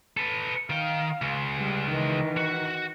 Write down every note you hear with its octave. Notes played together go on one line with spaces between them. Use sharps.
A4 B4
D#3 F5 G5
C#2
G3
D#3 E3
F#4